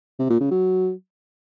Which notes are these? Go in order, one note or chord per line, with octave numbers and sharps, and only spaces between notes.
C3
A#2
C#3
F#3